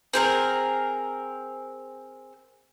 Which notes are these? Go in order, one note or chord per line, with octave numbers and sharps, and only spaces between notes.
C4 G#4 A#4